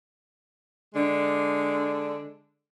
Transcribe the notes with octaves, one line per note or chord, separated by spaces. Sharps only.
D3 G#3 D4